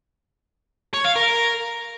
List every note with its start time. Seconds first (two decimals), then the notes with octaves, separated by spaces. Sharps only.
0.94 C#5
1.05 F5
1.16 A#4